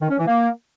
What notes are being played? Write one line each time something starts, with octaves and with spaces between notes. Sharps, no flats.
D#3
C#4
E3
A#3